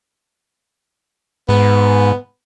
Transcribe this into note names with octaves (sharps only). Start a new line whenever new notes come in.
G#2 B3